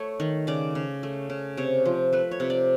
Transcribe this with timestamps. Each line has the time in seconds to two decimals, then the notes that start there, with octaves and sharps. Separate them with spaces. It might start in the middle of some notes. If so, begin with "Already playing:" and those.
Already playing: A3 C#5
0.20 D#3
0.47 C#3 D5
0.75 C#3
1.03 A3
1.30 C#3
1.57 C3 C#5
1.85 F3 C5
2.13 A3 B4
2.31 C#5
2.40 C3
2.50 D5